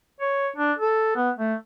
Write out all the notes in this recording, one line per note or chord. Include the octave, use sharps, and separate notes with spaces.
C#5
D4
A4
B3
A3